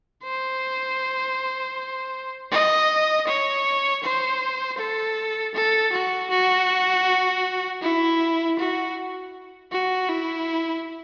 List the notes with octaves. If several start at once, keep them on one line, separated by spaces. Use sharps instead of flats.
C5
D#5
C#5
C5
A4
A4
F#4
F#4
E4
F#4
F#4
E4